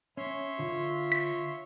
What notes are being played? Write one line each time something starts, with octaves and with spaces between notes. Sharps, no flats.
C#4 C#5 E5 C6
D3 F4
B6